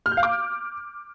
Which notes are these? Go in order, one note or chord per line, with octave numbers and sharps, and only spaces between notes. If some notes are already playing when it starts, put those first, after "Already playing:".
F6
G6
F5
D6